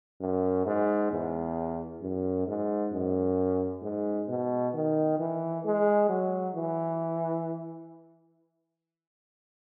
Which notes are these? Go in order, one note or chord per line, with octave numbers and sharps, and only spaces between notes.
F#2
G#2
E2
F#2
G#2
F#2
G#2
B2
D#3
E3
G#3
F#3
E3